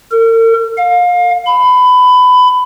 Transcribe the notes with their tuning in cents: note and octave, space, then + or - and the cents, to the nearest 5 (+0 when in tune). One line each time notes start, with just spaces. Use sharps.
A#4 -45
F5 +30
B5 +20